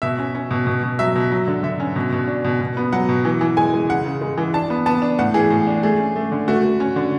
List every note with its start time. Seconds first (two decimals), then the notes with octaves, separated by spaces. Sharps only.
0.02 B2 E5
0.18 C#4
0.35 C#4
0.51 B2
0.67 B2
0.83 B2
0.99 F#3 E5
1.16 B2
1.32 F#3
1.47 D3
1.63 D3 E5
1.80 C#4
1.96 B2
2.12 B2
2.28 D4
2.44 B2
2.61 B2
2.77 B3
2.93 F#3 F#5
3.09 B2
3.25 E3
3.41 E3
3.57 G#3 G#5
3.74 G#3
3.89 C#3 F#5
4.06 C#3
4.21 G#3
4.38 E3
4.54 D4 A5
4.70 B3
4.86 B3 A5
5.02 D4
5.19 A2 F#5
5.34 E3 G#4
5.50 A2
5.67 D4
5.83 A3 G#4
5.99 C#4
6.16 A3
6.32 D3
6.48 A3 F#4
6.64 A3
6.80 C#4
6.96 D3